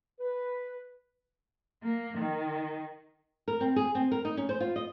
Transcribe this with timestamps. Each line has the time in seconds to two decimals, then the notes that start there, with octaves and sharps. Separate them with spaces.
0.20 B4
1.83 A#3
2.17 D#3
3.48 A#4
3.61 C4
3.76 G#4
3.95 C4
4.11 A#4
4.25 D#4
4.37 C#4
4.49 C5
4.60 F4
4.76 D#5